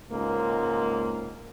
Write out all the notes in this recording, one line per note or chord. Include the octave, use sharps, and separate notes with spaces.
C#2 G#2 A#3